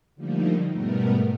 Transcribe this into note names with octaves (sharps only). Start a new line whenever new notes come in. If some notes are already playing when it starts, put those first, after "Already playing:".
D3 F3 G3 A3 A#3 D#4
G#2 B2 G3 A3 B3 A#4